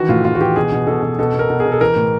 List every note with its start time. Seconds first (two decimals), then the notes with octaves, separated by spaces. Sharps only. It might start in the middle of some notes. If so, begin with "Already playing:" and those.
Already playing: D#3 E3 F#4
0.09 A2 F4
0.25 A2 F4
0.35 F#4
0.41 E3 G4
0.56 B2 G#4
0.72 B2
0.87 B2 A4
1.02 B2
1.19 B2 A4
1.34 B2
1.39 A#4
1.50 B2
1.60 G#4
1.65 B2
1.72 A4
1.81 E3 A#4
1.96 A2